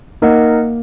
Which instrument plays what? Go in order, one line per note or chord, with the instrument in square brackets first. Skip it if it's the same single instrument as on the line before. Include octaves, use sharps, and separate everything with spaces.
[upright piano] A#3 [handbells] D#4 A#4 D#5 F#5